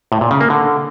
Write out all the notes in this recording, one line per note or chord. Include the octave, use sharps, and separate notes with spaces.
A2
A#2
C#3
A#3
D3